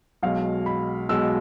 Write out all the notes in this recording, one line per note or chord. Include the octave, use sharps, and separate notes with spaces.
B1 B2 G#3 F5
B5
B1 B2 G#3 E6